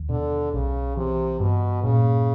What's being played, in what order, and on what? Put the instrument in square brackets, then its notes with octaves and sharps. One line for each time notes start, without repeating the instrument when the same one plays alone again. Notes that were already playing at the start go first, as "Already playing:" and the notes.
Already playing: [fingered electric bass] D#2
[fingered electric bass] B2 [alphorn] D3
[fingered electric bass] B1 [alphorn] C#3
[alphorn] C3 [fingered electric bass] E3
[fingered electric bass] G2 [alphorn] B2
[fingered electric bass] A#2 [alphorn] C#3